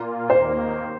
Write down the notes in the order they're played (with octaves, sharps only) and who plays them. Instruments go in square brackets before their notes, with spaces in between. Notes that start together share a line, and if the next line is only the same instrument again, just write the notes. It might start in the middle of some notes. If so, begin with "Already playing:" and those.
Already playing: [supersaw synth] A#2 A#3 F4
[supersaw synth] D#2 D#3 A#3 [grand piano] C5